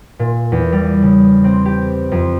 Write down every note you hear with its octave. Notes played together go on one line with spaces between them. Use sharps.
A#2
E2
G3
C#3
C4
G4
F2